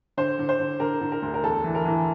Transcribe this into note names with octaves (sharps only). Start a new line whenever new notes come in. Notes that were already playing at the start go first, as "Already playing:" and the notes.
D3 C5
D3
C5
D3
D3 A#4
D3
A#4
D2
A#4
E2 A4
E3
A#4
E3